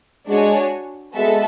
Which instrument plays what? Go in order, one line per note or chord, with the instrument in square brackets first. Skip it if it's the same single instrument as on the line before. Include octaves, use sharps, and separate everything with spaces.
[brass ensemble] G#3 [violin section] D4 F#4 C#5 G#5
[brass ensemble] G#3 [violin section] B3 F#4 A4 E5 A5